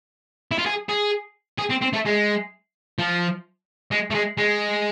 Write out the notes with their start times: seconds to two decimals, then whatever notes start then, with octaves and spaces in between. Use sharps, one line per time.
0.51 E4
0.59 F4
0.66 G#4
0.89 G#4
1.59 G#4
1.70 C4
1.82 C4
1.94 A3
2.06 G#3
2.99 F3
3.91 G#3
4.11 A3
4.15 G#3
4.38 G#3